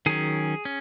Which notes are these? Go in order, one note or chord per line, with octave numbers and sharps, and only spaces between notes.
D#3 F#3 C#4 G#4
C#4